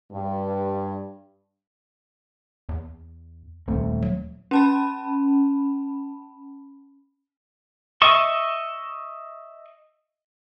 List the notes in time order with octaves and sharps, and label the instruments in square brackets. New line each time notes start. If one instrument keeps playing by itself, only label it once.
[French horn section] G2
[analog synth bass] E2
[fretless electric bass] D#1 A3 C4 [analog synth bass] C#2
[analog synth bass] F#3
[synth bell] C#4 A5 B5
[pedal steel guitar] D#5 E5 C#6